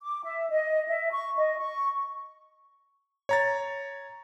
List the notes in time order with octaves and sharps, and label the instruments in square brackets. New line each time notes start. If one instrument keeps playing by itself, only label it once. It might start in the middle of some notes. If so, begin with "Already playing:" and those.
[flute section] D6
E5
D#5
E5
C#6
D#5
C#6
[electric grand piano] C#5 A#5 A6